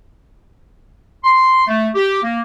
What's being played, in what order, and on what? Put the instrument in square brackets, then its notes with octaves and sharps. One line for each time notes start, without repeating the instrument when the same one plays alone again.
[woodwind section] C6
A3
G4
A#3